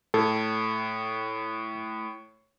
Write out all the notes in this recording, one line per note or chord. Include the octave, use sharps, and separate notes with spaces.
A2 A4